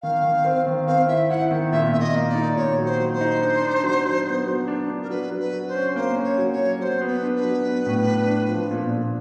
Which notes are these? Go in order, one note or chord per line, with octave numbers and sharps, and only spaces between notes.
D#3 F5
D#3
C4
D#3
C4 F5
E4 E5
E4 F#5
D#3
A#2 E5
A#2 E5
D#5
A#3
D5
D#4
A#2 C#5
F#3
C5
F#3
C5
D#4
D4
D4
F#3
F#3
B3
F#3
D4
D4
A#4
F#3 B4
F#3
B4
F#3
C5
C#4
A#3 C5
C#4
C#5
F#3
C#5
F#3
F#3 C5
B3
B4
D4
B4
F#3
B3
A2
D4
D4
F3
A#2
A#2